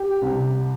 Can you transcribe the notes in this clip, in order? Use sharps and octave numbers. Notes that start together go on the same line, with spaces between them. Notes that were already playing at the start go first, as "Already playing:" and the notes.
Already playing: G4
C2